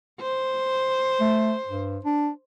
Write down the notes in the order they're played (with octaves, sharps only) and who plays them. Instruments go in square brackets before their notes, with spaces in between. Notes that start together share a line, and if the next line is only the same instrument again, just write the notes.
[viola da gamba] C5
[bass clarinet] A3
G2
D4